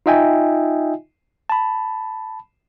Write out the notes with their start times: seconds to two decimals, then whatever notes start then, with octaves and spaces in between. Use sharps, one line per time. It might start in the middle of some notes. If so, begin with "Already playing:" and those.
0.06 D#4 F4 D#5 E5 G5 G#5
1.50 A5 B5